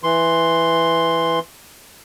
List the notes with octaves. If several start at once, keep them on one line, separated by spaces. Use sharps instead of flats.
E3 C6